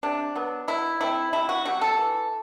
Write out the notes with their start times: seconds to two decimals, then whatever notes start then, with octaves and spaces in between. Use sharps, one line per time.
0.03 C3 D4
0.35 F#3 B3
0.68 B2 E4
1.00 A3 C4 E4
1.33 C3 E4
1.49 F#4
1.65 G3 C4 F#4
1.81 A4
1.98 E3